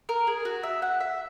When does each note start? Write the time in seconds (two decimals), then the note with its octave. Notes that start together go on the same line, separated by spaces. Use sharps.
0.09 A#4
0.27 G#4
0.45 F#4
0.63 E5
0.82 F#5
1.00 E5